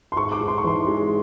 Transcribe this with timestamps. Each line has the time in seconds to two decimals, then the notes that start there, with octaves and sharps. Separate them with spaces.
0.12 C6
0.16 G#2 C#6
0.32 D6
0.41 G#2
0.48 C6
0.58 C#6
0.64 E3 C6
0.87 G#3